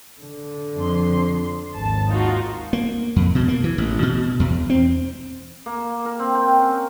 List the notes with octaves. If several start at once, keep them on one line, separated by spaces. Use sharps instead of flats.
D3
F2 C6
G#1 D#2 A5
D#4 F4 F#4
A#3
F2
B2
A#3
E3
A1
B2
E2
C4
A#3
A#4
C4
G5
C#4